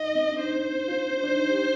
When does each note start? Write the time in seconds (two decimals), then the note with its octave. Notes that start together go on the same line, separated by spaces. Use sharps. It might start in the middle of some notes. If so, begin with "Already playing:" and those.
Already playing: D#4 D#5
0.15 C4
0.29 D4
0.39 D#4 C5
0.88 F4
1.12 D4
1.23 D4
1.31 D#4
1.50 G4